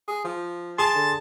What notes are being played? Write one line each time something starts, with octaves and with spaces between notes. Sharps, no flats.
G#4
F3
G#4 A5 C6
D3